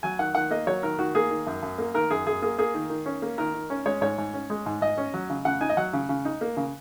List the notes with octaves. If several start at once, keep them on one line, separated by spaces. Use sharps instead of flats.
F#3 G#5
D#3 F#5
D#3 F#5
A#3 D#5
F#3 C#5
D#3 A#4
D#3 F#4
A#3 G#4
D#3
F#2
F#2
A#3
D#3 A#4
F#2 G#4
F#2 G#4
A#3 G#4
A#3 G#4
D#3
D#3
C#4
A#3
D#3 A#4
D#3
C#4
G#3 C#5
G#2 C#5
G#2
C#4
G#3
G#2
G#2 D#5
C#4
F#3
C#3
C#3 F#5
D#4 G#5
D#5
F#3 F#5
C#3
C#3
D#4
A#3
C#3